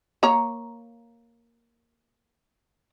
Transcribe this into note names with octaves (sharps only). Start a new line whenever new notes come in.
A#3 C#5 A#5